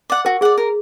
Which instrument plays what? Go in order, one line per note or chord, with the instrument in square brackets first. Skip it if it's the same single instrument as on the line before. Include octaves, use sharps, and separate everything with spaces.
[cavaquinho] D5 F#5
[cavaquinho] F#4 [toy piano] A#4
[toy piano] G#4 [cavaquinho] D5 F#5
[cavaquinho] A#4